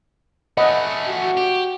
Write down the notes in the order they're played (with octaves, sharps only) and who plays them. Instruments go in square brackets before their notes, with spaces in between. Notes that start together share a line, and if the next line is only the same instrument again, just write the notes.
[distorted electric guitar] A3 C#4 [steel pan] D#5 F#5 B5
[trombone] F#4
[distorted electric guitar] G4